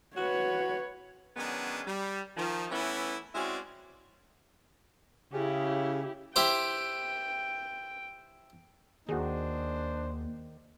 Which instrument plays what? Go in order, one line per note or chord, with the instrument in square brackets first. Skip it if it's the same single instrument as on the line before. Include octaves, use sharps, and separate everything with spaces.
[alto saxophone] F#4 [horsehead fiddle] B4 C#5
[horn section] D#3 F#3 G#3 B3 C#4 D4
G3
D#3 F3
E3 A3 B3 C#4 E4
G#3 C4 C#4 E4 F#4 D5
[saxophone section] C#3 [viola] E4 G4
[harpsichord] E4 G4 C5 [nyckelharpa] G5
[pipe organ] D#2 [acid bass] D#3 [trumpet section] D4 C5 [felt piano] F#4 G#4